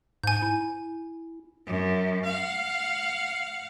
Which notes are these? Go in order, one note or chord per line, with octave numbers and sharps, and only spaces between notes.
G#2 G#5 G6
E4
F#2
F5 F#5